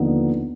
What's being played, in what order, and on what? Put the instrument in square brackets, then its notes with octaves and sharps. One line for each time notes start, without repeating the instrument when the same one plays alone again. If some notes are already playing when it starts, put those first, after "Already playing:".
Already playing: [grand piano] D#2 D3 F3 B3 D#4